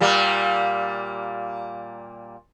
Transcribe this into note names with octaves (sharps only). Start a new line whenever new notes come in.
A#2 G3 A#3